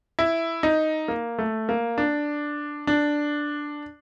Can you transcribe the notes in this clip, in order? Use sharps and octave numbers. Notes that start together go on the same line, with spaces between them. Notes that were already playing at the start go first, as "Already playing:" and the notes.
E4
D#4
A#3
A3
A#3
D4
D4